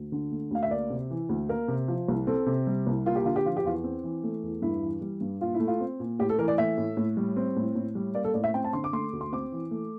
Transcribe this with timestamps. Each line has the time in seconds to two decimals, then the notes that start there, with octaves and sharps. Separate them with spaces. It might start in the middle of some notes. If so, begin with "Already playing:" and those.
Already playing: D2
0.12 D3
0.32 A3
0.51 D2 F5
0.63 E5
0.71 A#3 D5
0.90 C3
1.10 E3
1.29 D2
1.49 A#3 A#4
1.68 C3
1.88 F3
2.08 C2
2.27 C4 A4
2.46 C3
2.67 G3
2.87 C2
3.06 A#3 F4
3.15 G4
3.25 D3 F4
3.36 G4
3.45 F3 F4
3.57 G4
3.64 E2 F4
3.84 C4
4.03 E3
4.23 A3
4.43 E2
4.62 G2 E4
4.82 E3
5.01 G3
5.21 G2
5.41 A#2 F4
5.54 E4
5.60 A3
5.68 F4
5.80 C4
6.00 A#2
6.19 A2 G4
6.29 A4
6.39 E3 A#4
6.48 D5
6.58 A3 E5
6.78 A2
6.97 A2
7.17 G3
7.37 C4
7.56 A2
7.75 A2
7.95 G3
8.15 A#3 D5
8.24 A4
8.34 A2 D5
8.44 E5
8.54 C4 G5
8.64 A5
8.73 D3 C6
8.84 D6
8.93 A3 C6
9.13 D2
9.21 C6
9.32 C4 D6
9.52 E3
9.71 A3